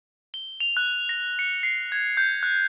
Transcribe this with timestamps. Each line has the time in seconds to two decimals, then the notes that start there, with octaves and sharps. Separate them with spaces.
0.34 G7
0.60 F7
0.77 F#6
1.09 A#6
1.39 C#7
1.63 C7
1.92 G#6
2.17 G6
2.43 F#6